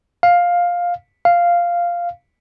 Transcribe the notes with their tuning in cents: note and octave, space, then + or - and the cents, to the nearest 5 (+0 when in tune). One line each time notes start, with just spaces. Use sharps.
F5 +10
F5 -5